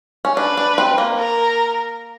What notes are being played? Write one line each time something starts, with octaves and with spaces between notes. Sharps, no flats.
C#4
D4 B4
D4
C4
A#3
A#4